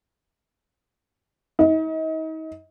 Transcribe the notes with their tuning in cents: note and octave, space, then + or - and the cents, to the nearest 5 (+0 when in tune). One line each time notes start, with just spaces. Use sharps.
D#4 +40